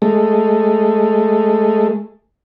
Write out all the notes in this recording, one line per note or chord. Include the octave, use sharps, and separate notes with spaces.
G#3 A3